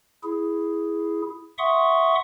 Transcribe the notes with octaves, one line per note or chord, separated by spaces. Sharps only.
E4 G#4
E5 F#5 C6 C#6 D#6